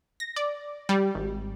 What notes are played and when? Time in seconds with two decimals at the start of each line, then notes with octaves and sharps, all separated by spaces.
0.20 A#6
0.36 D5
0.89 G3
1.15 G#1